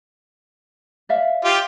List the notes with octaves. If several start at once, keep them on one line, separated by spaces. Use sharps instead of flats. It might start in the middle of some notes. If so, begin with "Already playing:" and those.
D5 E5 F5
F4 G4